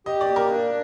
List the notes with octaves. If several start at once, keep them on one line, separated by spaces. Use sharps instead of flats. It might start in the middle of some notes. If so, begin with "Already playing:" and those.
G4 D#5
D5
A#3
A#4
D4